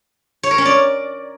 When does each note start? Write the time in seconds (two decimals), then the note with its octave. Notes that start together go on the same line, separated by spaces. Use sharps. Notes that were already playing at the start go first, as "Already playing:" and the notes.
0.43 C#5
0.51 A#4
0.58 C#4
0.66 D5